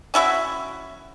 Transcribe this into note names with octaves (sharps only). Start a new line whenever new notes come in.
C#4 E4 F#4 E5